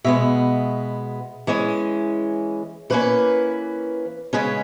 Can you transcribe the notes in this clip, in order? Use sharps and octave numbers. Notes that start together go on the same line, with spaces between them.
B2 G#3 B3 E5
E3 G#3 C#4
E3 A#3 C#4 B4
C#3 G#3 C#4 B4